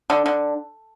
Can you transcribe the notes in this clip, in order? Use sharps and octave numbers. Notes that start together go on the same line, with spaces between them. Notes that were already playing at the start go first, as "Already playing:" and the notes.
D3
D3